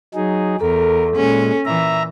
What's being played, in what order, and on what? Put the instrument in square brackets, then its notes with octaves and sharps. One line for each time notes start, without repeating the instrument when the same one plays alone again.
[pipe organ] F#3 D#4 G#4
[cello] E2 [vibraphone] A4 [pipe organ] A#4
[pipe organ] A#2 G#3 [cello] C#4
[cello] A#2 E3 [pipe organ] E5 A#5